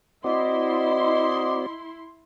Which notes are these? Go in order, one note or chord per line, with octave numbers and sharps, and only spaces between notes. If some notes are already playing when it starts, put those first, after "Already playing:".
C4 E4 F#4 D5 D#5 C6